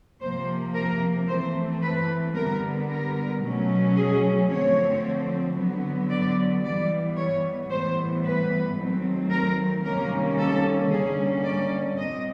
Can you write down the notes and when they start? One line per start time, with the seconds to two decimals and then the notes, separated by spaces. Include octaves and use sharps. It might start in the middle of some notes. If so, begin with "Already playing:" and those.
0.21 C3 F3 A#3 C5
0.75 A#4
1.28 E3 A3 C4 C5
1.82 B4
2.36 D3 G3 B3 A#4
2.90 A#4
3.42 B2 F#3 A3 C#4
3.96 G#4
4.49 D3 F3 A3 C4 C#5
5.57 D3 F#3 B3
6.10 D5
6.63 E3 G3 B3 D5
7.17 C#5
7.70 A2 E3 G3 B3 C5
8.25 B4
8.77 D#3 F#3 A3 C4
9.31 A#4
9.85 C3 D#3 G3 A#3 C#4 A#4
10.38 A4
10.91 D3 G3 A#3 C#4 G#4
11.44 D5
11.98 A#2 G3 C4 D#5